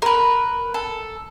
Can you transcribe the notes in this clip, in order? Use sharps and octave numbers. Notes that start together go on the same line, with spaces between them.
A#4 B4
A4